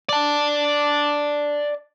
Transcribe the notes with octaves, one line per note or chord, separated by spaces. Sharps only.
D5 A5